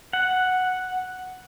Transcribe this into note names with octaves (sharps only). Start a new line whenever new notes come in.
F#5